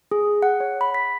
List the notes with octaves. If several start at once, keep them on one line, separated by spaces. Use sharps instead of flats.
G#4
F#5
C#5
B5
B6